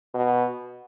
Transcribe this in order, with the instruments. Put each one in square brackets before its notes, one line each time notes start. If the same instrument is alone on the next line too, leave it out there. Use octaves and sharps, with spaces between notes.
[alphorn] B2